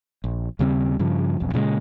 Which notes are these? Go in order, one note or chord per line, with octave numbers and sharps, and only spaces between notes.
A#1
D#2 C#3 G3 C4
G2 C#3 F3
E1 B1 F2
A#2 C#3 E3 G#3